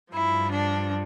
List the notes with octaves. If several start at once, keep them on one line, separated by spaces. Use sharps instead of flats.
G2 F3 E4
D4